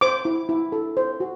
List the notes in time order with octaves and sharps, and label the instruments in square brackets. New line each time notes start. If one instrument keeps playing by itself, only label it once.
[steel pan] C5 D6
E4
E4
A4
C5
F#4